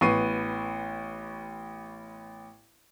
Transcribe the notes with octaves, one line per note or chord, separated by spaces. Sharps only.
A1 B3 C#6 C7 D#7